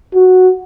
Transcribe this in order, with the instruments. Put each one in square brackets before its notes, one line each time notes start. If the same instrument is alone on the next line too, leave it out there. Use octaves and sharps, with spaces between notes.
[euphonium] F#4